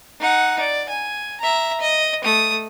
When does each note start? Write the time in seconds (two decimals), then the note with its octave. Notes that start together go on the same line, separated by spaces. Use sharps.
0.20 D#4 F#5
0.60 D5
0.89 G#5
1.41 E5 A#5
1.80 D#5
2.24 A3 D#6